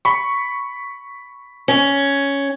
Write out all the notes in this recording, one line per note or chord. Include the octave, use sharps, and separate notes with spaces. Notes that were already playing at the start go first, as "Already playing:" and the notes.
B5 C#6
C#4